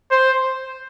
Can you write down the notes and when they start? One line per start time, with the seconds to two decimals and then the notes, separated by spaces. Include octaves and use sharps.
0.11 C5